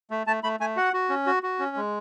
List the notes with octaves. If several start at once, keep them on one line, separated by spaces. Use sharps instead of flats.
A3
A3 A5
A3 B5
A3 G#5
F#4 F#5
F#4
C#4
F#4
F#4
C#4
G#3